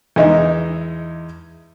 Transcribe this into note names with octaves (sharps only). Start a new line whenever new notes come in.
E2 G#3 D#4 E5